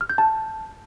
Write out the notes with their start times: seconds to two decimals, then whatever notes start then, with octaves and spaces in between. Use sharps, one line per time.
0.01 F6
0.10 G6
0.18 A5